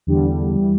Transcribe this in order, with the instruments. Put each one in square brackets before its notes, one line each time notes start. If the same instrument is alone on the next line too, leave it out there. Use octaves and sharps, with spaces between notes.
[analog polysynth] E2 D3 G3
E3 G3